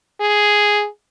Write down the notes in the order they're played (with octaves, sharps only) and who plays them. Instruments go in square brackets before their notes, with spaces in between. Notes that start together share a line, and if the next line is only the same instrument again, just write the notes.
[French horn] G#4